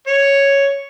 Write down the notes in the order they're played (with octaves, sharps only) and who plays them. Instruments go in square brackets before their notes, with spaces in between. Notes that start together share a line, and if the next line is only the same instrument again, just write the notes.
[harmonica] C#5